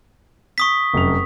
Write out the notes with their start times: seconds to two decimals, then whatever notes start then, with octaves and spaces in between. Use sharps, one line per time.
0.58 C#6 D#6 B6
0.94 F1 F#2 F7